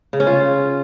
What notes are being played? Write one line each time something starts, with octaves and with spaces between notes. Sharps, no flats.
C#3
C#4
F4